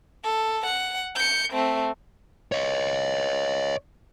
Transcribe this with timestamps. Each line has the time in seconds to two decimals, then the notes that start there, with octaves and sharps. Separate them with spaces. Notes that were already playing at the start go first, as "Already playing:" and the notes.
0.24 A4
0.66 F#5
1.15 G6 C#7
1.52 A3 C4
2.52 C#5 D#5